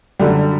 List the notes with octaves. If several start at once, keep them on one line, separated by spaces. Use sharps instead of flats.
F#2 D3 G3